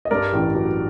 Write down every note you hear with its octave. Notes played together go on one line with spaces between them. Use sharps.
D#5
G2 A#4 D5
A1
F#3